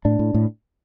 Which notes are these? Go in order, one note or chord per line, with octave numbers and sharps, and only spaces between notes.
A2 D4
A2
A2